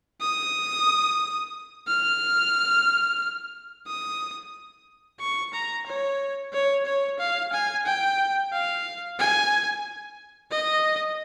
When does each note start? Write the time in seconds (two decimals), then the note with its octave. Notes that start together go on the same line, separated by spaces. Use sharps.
0.21 D#6
1.88 F6
3.87 D#6
5.20 C#6
5.53 A#5
5.86 C#5
6.53 C#5
6.86 C#5
7.19 F5
7.53 G#5
7.86 G5
8.53 F5
9.19 G#5
10.51 D#5